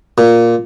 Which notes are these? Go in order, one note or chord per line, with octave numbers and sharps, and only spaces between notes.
A#2